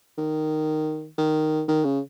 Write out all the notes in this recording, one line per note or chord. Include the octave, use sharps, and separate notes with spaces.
D#3
D#3
D#3
C#3